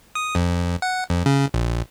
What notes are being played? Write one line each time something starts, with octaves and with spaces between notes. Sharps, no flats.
D#6
F2
F#5
F2
C#3
A#1